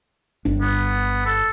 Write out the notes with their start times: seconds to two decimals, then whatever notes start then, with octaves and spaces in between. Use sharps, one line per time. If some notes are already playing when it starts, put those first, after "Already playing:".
0.45 G1 D4
0.61 B3
1.26 A4